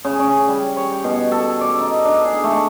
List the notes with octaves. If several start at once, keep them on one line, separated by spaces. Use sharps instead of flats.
C#3
C#4
G3
C#5
G5
B2
A4
D5
D#4
D4
G#4
A3